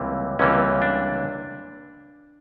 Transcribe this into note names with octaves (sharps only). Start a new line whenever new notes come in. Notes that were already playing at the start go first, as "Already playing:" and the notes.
Already playing: C#2 C3 E3 G3 A#3
C#2 C3 E3 G3 A#3 C#4
D4